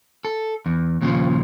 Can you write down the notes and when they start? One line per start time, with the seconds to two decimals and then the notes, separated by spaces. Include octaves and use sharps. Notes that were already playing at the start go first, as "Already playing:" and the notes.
0.25 A4
0.66 E2
1.01 D#2 A#2 C#3 F3